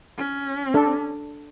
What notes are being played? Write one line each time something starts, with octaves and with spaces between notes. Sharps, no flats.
C#4
D4 A4